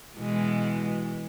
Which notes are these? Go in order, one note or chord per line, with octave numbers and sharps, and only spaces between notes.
B2 E3 G#3